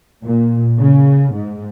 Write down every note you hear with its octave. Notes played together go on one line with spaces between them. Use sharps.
A#2
C#3
G#2